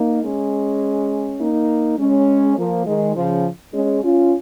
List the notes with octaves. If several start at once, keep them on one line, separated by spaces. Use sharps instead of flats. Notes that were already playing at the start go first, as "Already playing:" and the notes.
Already playing: A#3 D#4
G#3 C#4
A#3 D#4
G#3 C#4
F3 A#3
D#3 G#3
C#3 F3
G#3 C#4
C#4 F4